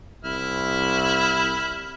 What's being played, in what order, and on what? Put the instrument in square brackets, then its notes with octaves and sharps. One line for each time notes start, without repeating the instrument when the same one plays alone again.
[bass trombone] C2 [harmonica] E4 F6